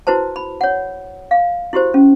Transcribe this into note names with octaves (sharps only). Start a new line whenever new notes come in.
E4 F#4 B4 C5 A5
B5
C#5 F#5
F5
E4 F#4 G4 C5
C#4